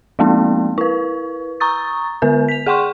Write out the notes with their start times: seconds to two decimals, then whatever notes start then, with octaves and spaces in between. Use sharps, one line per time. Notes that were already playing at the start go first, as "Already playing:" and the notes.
0.19 F3 G#3 A#3 C4 D#4
0.78 E4 B4
1.60 A#5 C#6 D#6 A6
2.22 D3 B3 A#4
2.49 B6 F7
2.66 G#4 F#5 G5 C6 C#6